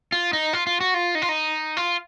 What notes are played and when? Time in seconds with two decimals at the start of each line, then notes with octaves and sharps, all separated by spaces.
0.12 F4
0.33 D#4
0.53 F4
0.67 F4
0.80 F#4
0.94 F4
1.15 D#4
1.22 F4
1.29 D#4
1.77 F4